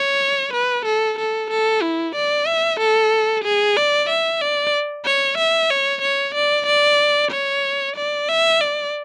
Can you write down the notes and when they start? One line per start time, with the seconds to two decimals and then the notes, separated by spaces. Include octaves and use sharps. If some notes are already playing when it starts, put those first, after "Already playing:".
Already playing: C#5
0.53 B4
0.86 A4
1.19 A4
1.51 A4
1.83 E4
2.15 D5
2.47 E5
2.80 A4
3.44 G#4
3.77 D5
4.09 E5
4.42 D5
5.05 C#5
5.38 E5
5.71 C#5
6.02 C#5
6.35 D5
6.66 D5
7.31 C#5
7.96 D5
8.29 E5
8.61 D5